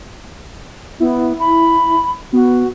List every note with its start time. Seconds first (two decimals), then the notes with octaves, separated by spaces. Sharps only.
1.00 B3 E4
1.40 B5
2.33 B3 F#4